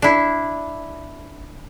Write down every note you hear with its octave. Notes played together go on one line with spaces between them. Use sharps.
D4 E4